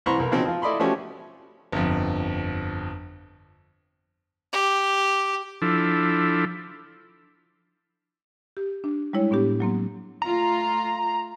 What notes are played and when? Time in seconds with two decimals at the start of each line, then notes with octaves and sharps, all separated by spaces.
0.06 C2 E3 C5 A#5 B5 C#6
0.19 B1 A#4
0.32 C#3 F3 B3 C4 D#4 F#4
0.46 F3 F4
0.62 E4 A4 D5 D#5 B5 C6
0.80 F3 A3 C#4 F#4 G4
1.72 G1 F2
4.53 G4
5.62 F3 D4 E4 A4
8.57 G4
8.84 D4
9.13 G3 G#3 E4 C#5
9.31 A2 B3 D4 G4
9.60 F#3 A#3 C4
10.22 A3 F4 A#5